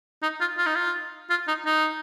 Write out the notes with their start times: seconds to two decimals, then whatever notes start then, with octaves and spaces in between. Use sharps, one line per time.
0.22 D#4
0.40 F4
0.58 F4
0.66 D#4
0.75 F4
1.30 F4
1.48 D#4
1.66 D#4